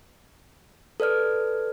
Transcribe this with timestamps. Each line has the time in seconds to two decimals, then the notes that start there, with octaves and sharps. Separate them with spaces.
1.00 A4 B4 D5 F6